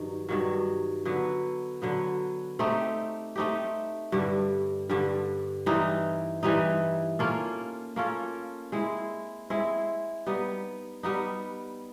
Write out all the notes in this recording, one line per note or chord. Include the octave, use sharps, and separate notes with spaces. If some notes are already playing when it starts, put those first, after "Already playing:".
Already playing: G2 D#3 F#3
G2 D#3 F#3
D3 F#3 B3
D3 F#3 B3
A3 C4 D#4 G4
A3 C4 D#4 G4
G2 D3 G3
G2 D3 G3
E3 G3 C4 D#4
E3 G3 C4 D#4
A#3 C#4 F4 A4
A#3 C#4 F4 A4
G#3 C4 E4
G#3 C4 E4
G3 B3 D#4
G3 B3 D#4